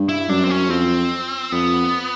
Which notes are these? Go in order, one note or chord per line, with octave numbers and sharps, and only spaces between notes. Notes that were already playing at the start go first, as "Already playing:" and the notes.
Already playing: G2
E4
F#2 D4
C4
C#4
F2 C4
F2 B3